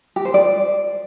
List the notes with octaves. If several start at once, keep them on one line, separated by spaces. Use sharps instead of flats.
G4
C5
D5